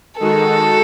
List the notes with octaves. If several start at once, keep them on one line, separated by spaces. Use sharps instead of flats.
D#3 G#3 D#4 F#4 A4